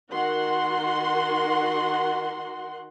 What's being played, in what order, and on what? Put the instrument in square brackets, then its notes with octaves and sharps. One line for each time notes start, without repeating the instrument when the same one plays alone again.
[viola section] D#3 F#4 F#5 C6